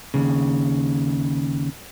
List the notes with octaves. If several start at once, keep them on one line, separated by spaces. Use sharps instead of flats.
D#2 G#2 C#3